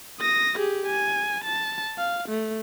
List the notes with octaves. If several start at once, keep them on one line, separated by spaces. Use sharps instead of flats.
D#6 A#6
G4 G#4
G#5
A5
F5
A3